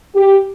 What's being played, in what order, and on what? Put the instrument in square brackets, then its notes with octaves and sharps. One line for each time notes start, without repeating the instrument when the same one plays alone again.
[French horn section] G4